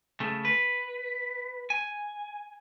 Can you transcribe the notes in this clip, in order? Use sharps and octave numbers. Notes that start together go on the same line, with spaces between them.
C#3 A3
B4
G#5